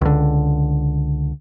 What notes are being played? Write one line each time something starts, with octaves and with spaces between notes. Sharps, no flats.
C#2 D3